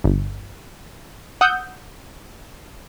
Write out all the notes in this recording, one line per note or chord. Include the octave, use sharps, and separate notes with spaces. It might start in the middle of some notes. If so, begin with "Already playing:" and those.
G1
F#5 D#6 E6 G6